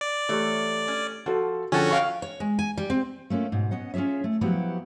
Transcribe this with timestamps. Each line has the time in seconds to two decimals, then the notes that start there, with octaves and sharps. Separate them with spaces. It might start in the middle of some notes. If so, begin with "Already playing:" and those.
0.01 D5
0.29 E2 A3 G4 C#5
0.88 C#4
1.26 F3 F#4 A4
1.72 D3 F3 C#4 F#4 G#4 A4 F#5 G5
1.91 F#2 F5 G5 C#6
2.22 C#5
2.40 G#3
2.59 G#5
2.78 G3
2.90 C4
3.30 A3 A#3 C#4 F4
3.52 G#2 B2
3.71 B3 C#4 D#5 F#5
3.94 C#4 F4 G#4 C#5 E5
4.24 A3
4.41 F3 F#3 B3 E4 F#4 G4